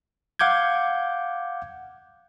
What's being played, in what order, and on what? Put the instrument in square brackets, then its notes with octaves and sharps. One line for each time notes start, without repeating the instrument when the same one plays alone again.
[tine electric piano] F5 F#5 D6 G6 G#6